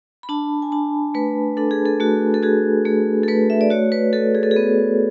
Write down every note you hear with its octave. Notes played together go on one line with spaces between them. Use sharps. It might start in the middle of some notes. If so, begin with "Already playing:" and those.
B5
D4 A5
G#5
D4 A5
A3 B4
D4 A4
G#4
A4
A3 F#4
A4
F#4 G#4
A3 G#4
A4
A3 B4
E5
D5
F#4 C#5
B4
F#4 A4
G#4
A4
G#4
B3